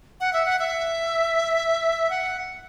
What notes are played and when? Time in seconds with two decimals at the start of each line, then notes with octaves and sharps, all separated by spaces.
0.20 F#5
0.33 E5
0.45 F#5
0.59 E5
2.10 F#5